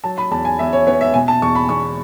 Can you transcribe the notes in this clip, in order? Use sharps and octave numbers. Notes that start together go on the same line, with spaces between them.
F#3 A5
B5
E2 A5
G#5
E2 E5
C#5
B3 C#5
E5
B2 G#5
A5
E2 C#6
B5
E2 C#6